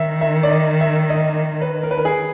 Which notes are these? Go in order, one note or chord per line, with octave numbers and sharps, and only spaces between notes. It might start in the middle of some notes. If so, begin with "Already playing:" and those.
Already playing: D#3 E5
E5
D5
D#5
E5
D#5
B4
A#4
B4
A#4
G#4